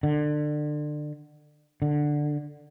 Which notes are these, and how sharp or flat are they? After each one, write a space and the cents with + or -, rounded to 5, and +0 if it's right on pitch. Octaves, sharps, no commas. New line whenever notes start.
D3 +25
D3 +10